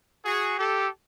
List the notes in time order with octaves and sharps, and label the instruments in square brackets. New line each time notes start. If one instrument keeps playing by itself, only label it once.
[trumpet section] F#4 G#4
G4 A4